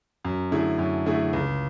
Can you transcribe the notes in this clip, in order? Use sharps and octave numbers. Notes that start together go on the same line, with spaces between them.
F#2
D3 A3 E4 G#4
F#2
D3 A3 E4 G#4
C#2